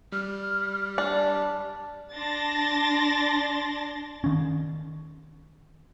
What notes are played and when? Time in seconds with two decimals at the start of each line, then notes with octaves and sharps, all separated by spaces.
0.12 G3 F6
0.98 D4
2.16 D4 C6 A6 A#6
4.24 D#3 C#4